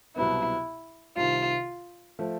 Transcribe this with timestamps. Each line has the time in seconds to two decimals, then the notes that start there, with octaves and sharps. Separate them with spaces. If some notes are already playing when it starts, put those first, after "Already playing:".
0.16 C2 B2 F#3 B3 E4
1.17 C2 C3 D#3 F4
2.19 F3 A3